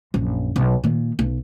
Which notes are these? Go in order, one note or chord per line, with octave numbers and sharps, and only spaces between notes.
A#1 F#2
B1
A#2 D#3
B1